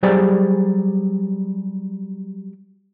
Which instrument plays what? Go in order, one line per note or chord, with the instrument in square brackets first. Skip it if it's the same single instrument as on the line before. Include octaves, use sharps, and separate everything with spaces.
[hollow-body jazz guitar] F#3 G3 G4 G#4 C5 D5